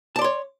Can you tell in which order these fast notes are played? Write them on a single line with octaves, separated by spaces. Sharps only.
A5 D5 C6 C#5